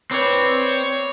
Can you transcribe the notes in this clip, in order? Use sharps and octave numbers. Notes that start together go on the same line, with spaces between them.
C4 B4 C#5 D5 B5